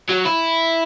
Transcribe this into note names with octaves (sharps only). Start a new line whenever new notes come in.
F#3
E4